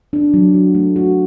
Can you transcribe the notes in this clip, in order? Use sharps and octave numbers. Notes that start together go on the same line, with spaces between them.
D4
F#3
F#4
A3
F#4